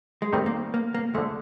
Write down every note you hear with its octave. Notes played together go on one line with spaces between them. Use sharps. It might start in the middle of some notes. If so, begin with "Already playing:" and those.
G#3
D#3 G3 A3 C4 D#4
A#3
A#3
A#3
D3 F3 G#3 A3